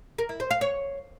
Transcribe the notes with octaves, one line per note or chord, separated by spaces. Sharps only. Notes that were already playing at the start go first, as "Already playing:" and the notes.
A#4
E4
C5
F5
C#5